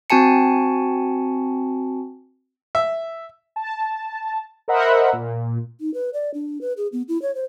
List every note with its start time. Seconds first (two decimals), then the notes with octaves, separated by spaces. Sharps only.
0.10 C4 F#4 G#5 A5 C#7
2.75 E5
3.56 A5
4.68 A#4 C5 D#5 E5 F#5 B5
5.13 A#2
5.81 D#4
5.94 B4
6.13 D5
6.34 D4
6.61 B4
6.77 G#4
6.92 B3
7.08 E4
7.22 C#5
7.35 C5